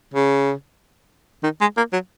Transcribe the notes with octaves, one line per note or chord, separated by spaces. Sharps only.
C#3
D#3
G#3
A#3
F#3